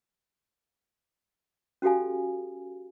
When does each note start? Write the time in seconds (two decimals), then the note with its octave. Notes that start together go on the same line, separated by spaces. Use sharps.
1.82 C#4 F#4 G4 A4 F5 G#5